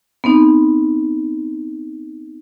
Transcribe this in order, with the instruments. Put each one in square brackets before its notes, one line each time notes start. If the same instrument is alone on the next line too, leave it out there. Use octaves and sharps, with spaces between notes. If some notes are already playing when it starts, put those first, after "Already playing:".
[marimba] B3 C4 D#4